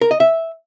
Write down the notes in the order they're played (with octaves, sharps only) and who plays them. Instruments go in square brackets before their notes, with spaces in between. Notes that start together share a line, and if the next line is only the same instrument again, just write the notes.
[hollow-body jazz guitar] A#4
D#5
E5